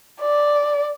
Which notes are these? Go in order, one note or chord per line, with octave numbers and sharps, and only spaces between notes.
D5